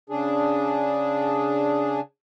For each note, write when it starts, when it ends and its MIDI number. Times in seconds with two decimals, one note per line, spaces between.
0.10 2.00 49
0.10 2.00 62
0.10 2.00 68